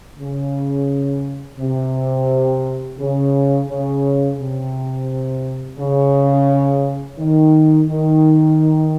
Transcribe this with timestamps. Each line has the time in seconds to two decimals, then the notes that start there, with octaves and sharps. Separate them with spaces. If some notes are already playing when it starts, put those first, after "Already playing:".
0.18 C#3
1.59 C3
2.99 C#3
3.68 C#3
4.39 C3
5.79 C#3
7.19 D#3
7.89 D#3